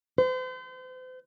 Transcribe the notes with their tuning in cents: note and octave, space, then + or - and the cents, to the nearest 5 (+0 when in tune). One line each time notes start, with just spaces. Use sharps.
C5 -40